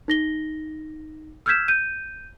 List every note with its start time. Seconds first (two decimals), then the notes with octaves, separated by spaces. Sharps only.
0.08 D#4 A#6 G7
1.46 E6 F6 G6 G#6 B6 E7
1.68 G6 D#7